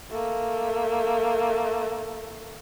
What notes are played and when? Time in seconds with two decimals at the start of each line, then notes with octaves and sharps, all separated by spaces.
0.11 A3 A#3